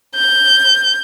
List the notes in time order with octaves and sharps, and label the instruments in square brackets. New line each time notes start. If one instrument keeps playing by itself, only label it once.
[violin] G6